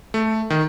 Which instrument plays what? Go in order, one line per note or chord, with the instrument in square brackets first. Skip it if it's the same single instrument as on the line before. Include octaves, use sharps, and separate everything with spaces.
[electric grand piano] A3
D#3